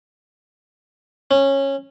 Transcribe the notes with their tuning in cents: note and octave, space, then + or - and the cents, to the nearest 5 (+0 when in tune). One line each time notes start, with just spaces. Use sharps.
C#4 -15